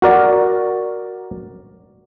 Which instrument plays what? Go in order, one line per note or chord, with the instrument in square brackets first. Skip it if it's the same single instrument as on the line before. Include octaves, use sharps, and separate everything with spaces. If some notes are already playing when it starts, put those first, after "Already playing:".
[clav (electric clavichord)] F#4 A#4 D5